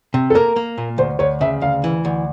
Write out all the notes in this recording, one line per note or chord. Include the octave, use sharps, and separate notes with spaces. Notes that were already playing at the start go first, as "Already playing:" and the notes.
C3
A4
A#3 A#4
A#3
A#2
D2 C5
D2 C#5
C#3 E5
D2 F5
E3
D2